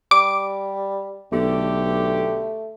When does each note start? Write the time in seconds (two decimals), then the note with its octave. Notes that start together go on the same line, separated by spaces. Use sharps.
0.11 G3 D6
1.32 B1 B2 D3 A3 G4